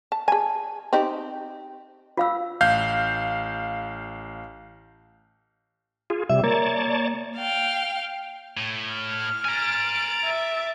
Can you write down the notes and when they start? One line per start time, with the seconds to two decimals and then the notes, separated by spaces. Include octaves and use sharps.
0.12 A5
0.28 G#4 G#5 A5
0.93 C4 D#4 G4
2.17 F4 F5 E6
2.61 A1 F5 G6
6.10 F4 G#4
6.30 C3 G3 E5
6.44 A#3 C#5 D5 A5
7.36 F5 G5
8.57 A2
8.94 F6
9.45 G#5 A#5 A6 D7
10.26 E5